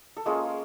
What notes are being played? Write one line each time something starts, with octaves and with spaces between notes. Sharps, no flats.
A4
G#3 A#3 C#4 F4 G#4